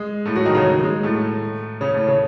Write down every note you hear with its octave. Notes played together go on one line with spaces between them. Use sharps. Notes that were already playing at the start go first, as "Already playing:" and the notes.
Already playing: G#3
A2 A3
F#3 F#4
D#3 D#4
C#3 C#4
F#3
G#3
A2 A3
C#3 C#4
A2 A3
C#3 C#4